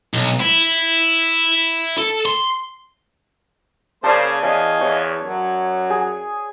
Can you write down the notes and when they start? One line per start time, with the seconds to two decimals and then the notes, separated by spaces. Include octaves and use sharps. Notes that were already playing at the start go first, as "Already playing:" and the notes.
0.14 B1
0.40 E4
1.98 A4
2.26 C6
4.04 C#3 A#3 C5 D5 A5 C6
4.43 E2 C#5 D#5 F5 G#5
4.81 E2 C#5
5.23 F#2 F#3
5.90 G#4